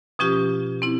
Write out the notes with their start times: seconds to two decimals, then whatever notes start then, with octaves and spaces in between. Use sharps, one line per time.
0.19 B2 F3 C#4 F4 G4
0.82 C4 E4